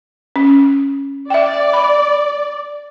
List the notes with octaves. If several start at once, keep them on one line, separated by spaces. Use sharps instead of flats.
C#4
D5 E5 G5
B5